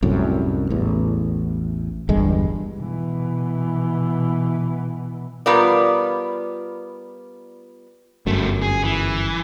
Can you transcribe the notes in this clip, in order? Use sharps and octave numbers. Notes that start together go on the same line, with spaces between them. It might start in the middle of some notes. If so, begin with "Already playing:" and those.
C2 F#2 A2
A1 E2
G1 E2 G2 G#3
B2 E3
G3 B3 F4 A#4 D5
G1 F#2 G3 A3
G#4
E3